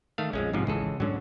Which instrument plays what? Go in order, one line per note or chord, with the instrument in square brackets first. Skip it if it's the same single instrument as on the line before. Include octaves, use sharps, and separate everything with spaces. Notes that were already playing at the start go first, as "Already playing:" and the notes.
[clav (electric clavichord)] D#3 A3 F5
[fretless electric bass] A#1 F2 [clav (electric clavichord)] F3 G#3 C#4
[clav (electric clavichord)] G#2 C3 F3
[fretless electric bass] G#1 E3 [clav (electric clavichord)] C#2 G#4 A4
[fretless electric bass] G#2 G#3 C#4 [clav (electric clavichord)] D3 F#3